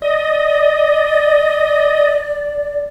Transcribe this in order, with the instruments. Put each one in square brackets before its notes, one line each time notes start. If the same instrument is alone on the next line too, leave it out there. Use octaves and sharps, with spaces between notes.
[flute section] D5 [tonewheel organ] D#5